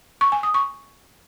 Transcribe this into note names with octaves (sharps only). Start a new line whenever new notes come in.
C#6
G#5
D#6
C#6